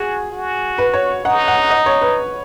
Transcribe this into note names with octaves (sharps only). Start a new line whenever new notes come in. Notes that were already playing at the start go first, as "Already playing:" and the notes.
Already playing: F#4 G#4
F#4
B4
C#5
D#4 F#5
F#5
D#5
C#5
B4